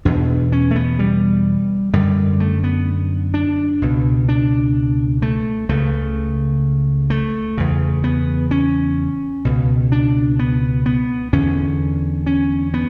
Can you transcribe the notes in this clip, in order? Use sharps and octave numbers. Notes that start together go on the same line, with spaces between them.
E2 B2 D4
C#4
A3
B3
G3
F#2 D3 G3
A3
B3
D4
C#2 B2
D4
A3
C#2 C#3 A3
A3
E2 C#3
B3
C#4
C#2 B2
D4
B3
B3
E2 D3 C#4
C#4
B3